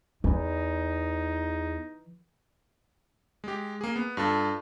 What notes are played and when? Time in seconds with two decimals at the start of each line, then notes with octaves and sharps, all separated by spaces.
0.24 E2 E3 D#4
3.44 G#3 G4
3.81 A#3 G#4
3.96 B3
4.17 G2 F4 A4 A5